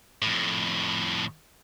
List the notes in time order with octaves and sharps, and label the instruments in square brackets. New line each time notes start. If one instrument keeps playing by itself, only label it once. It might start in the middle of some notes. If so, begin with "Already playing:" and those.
[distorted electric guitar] F2 A2